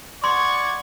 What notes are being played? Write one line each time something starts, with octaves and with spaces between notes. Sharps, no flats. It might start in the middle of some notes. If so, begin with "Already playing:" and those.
D5 F#5 C6 C#6 G#6